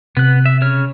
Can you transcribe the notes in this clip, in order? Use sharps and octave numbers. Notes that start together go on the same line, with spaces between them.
C3 B3 F#6
E5
C#3 C#5 F6